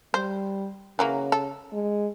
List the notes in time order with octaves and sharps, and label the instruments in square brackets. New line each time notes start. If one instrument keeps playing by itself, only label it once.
[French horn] G3 [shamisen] C5
[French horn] C#3 [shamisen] E3 F#3 A#3
[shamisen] A4
[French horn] G#3